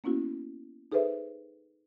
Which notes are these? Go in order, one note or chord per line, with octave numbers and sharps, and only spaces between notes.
A#3 B3 C#4 E4 F#4
D#4 G#4 A4 B4 C5 E5